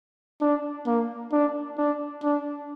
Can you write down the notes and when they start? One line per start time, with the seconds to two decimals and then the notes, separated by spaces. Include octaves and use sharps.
0.41 D4
0.87 A#3
1.32 D4
1.78 D4
2.24 D4